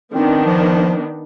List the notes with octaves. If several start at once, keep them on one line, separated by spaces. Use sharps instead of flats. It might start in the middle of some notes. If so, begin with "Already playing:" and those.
D#3 B3 C4 D4
F3